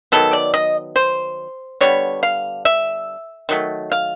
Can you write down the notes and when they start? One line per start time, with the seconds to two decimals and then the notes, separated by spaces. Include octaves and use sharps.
0.12 D#3 F#3 B3 A4
0.33 D5
0.54 D#5
0.96 C5
1.81 D3 G3 B3 C#5
2.23 F5
2.65 E5
3.49 D#3 F#3 A3
3.92 F5